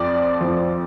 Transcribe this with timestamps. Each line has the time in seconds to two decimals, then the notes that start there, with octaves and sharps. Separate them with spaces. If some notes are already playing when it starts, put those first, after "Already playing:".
Already playing: F2 F3 D5
0.41 F2 F3